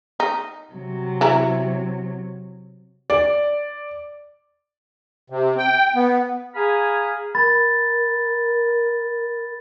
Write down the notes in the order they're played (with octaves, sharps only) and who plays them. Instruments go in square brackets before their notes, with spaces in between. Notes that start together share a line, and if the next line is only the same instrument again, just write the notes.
[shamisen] D#4
[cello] C3 F#3
[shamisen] E3 E4 A#5
[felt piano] D5
[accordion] C3
G5
B3
[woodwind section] G#4 F5 G#5 A#5 B5 F6
[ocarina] A#4 [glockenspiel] B5 A6